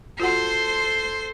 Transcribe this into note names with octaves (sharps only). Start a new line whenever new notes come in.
F4 F#4 A4 C5 F#5 C6